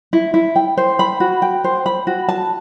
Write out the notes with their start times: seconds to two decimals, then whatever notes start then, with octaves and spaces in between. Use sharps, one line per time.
0.13 E4
0.34 E4
0.56 G5
0.77 C5
0.99 B5
1.20 F#4
1.42 G5
1.64 C5
1.86 B5
2.07 F#4
2.29 A5